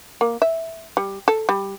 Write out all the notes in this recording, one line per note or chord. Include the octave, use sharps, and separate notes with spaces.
A#3
E5
G3
A4
G3